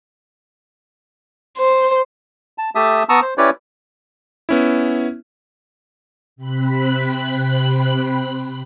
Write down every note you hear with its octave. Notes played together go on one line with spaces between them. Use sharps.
C5
A5
A3 G4 E5 A5 D#6
B3 A5 A#5 C#6 D#6 E6
C5
C#4 E4 G4 B4 C#5 D5
B3 C#4 E4
C3 C4 B5 F#6 B6